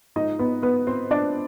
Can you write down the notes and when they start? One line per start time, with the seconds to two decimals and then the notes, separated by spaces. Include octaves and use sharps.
0.16 G#2 F3 D#4 D#5
0.39 B3 B4
0.62 B3 B4
0.87 C4 C5
1.11 D4 D5